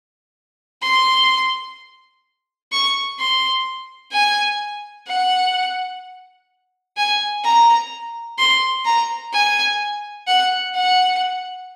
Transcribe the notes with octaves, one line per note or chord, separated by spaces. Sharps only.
C6
C#6
C6
G#5
F#5
G#5
A#5
C6
A#5
G#5
F#5
F#5